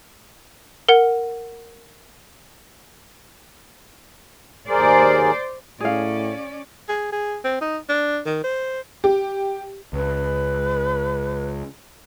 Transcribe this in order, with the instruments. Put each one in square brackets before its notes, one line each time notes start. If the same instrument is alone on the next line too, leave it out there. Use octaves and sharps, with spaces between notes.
[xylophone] A#4 F#5
[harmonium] D#2 G#4 A#4 [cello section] C5 D5
[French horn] A2 [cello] C#4 D5 [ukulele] G#4 F5
[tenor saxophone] G#4
G#4
C4
D#4
D4
D#3
C5
[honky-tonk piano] G4
[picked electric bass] C#2 [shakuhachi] B4